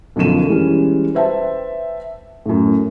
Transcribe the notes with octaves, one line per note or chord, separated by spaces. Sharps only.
B1 F#2 D3 F3 D#7 E7
E3 G3 G#3 C#4
B4 C5 E5 G5 A5
F#2 A2